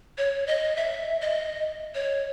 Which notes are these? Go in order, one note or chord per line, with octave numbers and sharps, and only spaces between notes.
C#5
D#5
E5
D#5
C#5